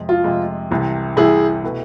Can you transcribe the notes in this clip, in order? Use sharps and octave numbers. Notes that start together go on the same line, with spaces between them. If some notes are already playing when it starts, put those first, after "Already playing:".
Already playing: F2 C3 G#3
F4
F2 C3 G#3
C2 C3 E3
C2 C3 E3 E4 G#4
B2 A3 E4 B4